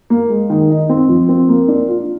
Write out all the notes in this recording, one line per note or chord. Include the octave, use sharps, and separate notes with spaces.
A#3
G#3
D#3
D#4
C4
F3
C4
A#3
D4
F4